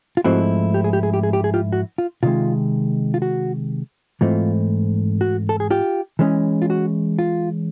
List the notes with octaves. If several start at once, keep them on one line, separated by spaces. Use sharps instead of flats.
F4
G#2 F3 A3 C4 E4 F#4
G4
G#4
G4
G#4
G4
G#4
G4
G#4
F4 G4
F#4
F4
C3 D#3 G#3 F4
F4
F#4
G#2 E3 A3 C4 F4
F#4
A4
G#4
F4 G4
E3 G#3 C#4
F4
F#4
F4